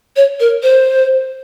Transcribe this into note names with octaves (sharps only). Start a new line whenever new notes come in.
C#5
A#4
C5